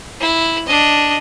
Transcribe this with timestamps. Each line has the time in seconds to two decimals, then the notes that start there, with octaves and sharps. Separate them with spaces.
0.21 E4
0.67 D4 D#5